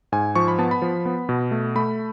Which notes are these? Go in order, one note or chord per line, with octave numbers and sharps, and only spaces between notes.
G#2 G#5
F3 C#6
B5
B3 A5
B5
F3
B3
B2
A3
A3 B5